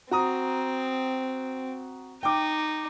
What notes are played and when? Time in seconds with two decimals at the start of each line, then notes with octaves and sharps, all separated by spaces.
0.11 C4 F#4 A#5 D#6
2.23 D#4 G5 D6